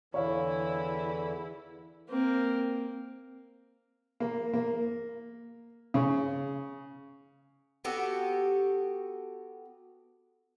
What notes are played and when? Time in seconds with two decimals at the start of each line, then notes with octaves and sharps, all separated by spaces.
0.14 E2 D3 E3 E4 C#5 F5
2.09 A#3 C4
4.20 A#3
4.53 A#3
5.94 C#3
7.85 B3 F#4 G4 A4